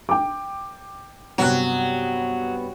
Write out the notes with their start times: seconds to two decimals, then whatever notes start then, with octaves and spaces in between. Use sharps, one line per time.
0.09 G5 D6
1.38 G2 C3 F#3 B3 F#6